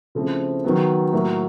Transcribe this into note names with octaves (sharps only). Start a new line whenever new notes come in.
C#3 F3 A3 C4 E4
D#3 F#3 B3
A2 F#3 A#3